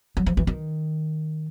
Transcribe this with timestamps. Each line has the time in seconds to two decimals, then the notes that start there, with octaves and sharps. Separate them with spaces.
0.17 F#3
0.26 F3
0.37 E3
0.47 D#3